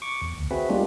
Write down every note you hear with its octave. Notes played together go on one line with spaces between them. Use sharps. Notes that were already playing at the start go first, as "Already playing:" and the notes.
C#6 D6
E2
D2
C4 F#4 G#4 B4 E5
G3 G#3 A#3 D4 F4 G4